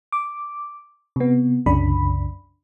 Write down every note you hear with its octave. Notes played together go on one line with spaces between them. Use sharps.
D6
C3 B3
C2 F#2 C#3 D4 B5